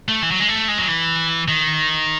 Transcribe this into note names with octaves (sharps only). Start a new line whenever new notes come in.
A3
E3
F#3
G#3
A3
G#3
F#3
E3
D#3